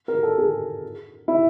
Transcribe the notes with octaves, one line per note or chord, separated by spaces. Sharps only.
A#4
A4
G#4
E4